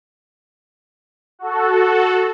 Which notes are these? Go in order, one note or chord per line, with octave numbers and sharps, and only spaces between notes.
F#4 A4